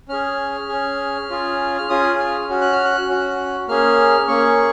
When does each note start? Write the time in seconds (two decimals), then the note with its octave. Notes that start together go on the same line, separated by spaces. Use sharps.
0.09 C#4 G#4 F6
0.69 C#4 G#4
1.29 C#4 F4 G#4
1.78 F6
1.89 C#4 F4 G#4 D#6
2.19 F6
2.48 C#4 F#4
2.61 F#6
2.72 F6
2.85 F#6
3.08 C#4 F#4
3.68 A#3 C#4 G#4 F6
4.28 A#3 C#4 G#4 C#6